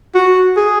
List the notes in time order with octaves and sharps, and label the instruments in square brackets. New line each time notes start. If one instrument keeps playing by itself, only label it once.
[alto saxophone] F#4
G#4